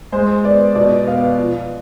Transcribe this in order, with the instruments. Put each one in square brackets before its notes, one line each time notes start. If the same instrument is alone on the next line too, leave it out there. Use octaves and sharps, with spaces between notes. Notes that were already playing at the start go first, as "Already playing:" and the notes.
[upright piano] G#3 C5
B3 D5
B2 D5
B3 F5
F3